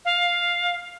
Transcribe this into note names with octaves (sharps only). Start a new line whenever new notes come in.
F5